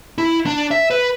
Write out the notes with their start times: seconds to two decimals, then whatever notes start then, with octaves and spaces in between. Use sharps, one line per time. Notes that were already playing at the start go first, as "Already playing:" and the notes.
0.18 E4
0.46 D4
0.71 E5
0.91 B4